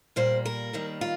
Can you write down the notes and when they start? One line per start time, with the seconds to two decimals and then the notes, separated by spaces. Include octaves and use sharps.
0.16 A#2 G3 A#3 C5
0.45 A#4
0.73 D#2 D#3 G3 A#3
1.01 F4